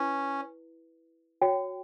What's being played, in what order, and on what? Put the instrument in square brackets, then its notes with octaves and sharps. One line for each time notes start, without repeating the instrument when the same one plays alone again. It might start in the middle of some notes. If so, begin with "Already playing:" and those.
Already playing: [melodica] C#4 [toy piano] E4 B4
[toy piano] F#4 C#5 G5